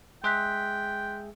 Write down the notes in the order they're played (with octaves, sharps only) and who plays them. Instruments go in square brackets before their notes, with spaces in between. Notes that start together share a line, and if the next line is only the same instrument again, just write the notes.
[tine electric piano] G#3 G#4 E5 [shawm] G5 [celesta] C6 F#6 B6